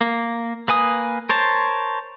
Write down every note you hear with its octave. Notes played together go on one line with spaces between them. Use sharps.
A#3
A#3 B4 G#5 D#6
A#4 C5 C#5 A5